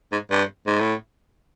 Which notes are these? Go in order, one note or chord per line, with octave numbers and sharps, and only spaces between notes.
G#2
G2
G#2
A2